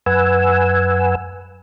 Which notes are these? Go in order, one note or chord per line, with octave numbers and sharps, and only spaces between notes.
F#2 B4 F#5 G#5 E6